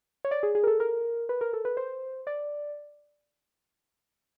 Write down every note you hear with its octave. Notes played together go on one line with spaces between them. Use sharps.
C#5
D5
G#4
G#4
A#4
A4
A#4
B4
A#4
A4
B4
C5
D5